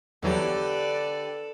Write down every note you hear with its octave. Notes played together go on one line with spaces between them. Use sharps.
E2 D3 E3 F#3 G4 A4 B4 D5